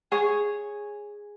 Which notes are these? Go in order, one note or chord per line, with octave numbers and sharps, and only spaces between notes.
G#4 C#5